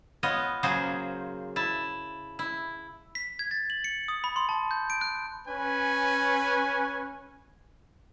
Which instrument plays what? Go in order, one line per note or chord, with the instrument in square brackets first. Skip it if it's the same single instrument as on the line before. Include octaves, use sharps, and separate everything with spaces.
[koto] B3 F4 C#5 D#5
C#3 F#3 A#3 G#4 C5
E4 A5
E4
[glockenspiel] B6
G#6
A6
F#7
C#7
D#6
B5
C6
A5
G6
D7
F#6
[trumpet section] C#4 B4 G#5